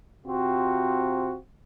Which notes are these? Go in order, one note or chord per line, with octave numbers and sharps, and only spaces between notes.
C3 C4 F4 F#4